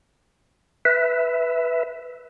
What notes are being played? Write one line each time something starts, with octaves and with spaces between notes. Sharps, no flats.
B4 E5